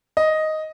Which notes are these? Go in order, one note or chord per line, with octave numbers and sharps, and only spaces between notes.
D#5